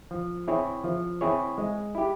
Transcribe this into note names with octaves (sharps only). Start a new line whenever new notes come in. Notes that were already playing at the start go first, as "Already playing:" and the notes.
F3
C4 E4 G#4 C#5
F3
C4 E4 G#4 C#5
G#3
E4 G4